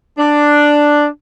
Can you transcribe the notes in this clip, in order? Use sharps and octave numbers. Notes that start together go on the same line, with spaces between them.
D4